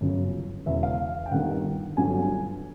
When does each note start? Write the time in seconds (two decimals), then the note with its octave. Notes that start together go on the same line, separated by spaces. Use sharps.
0.01 G1 F#2 C#3
0.66 E1 E2 C#3 E3 E5
0.76 E5
0.83 F5
1.26 G5
1.31 G1 G2 D#3 F#5
1.97 G1 G2 D3 F#3 G#5